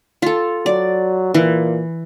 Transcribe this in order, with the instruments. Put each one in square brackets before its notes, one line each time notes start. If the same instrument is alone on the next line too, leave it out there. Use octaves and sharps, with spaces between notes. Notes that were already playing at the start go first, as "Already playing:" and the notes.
[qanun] F4 A4
[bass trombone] F#3 [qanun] D5
[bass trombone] A#2 [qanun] E3